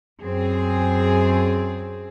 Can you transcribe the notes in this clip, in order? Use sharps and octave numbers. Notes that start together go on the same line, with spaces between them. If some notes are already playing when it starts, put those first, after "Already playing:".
F#2 C4 G#4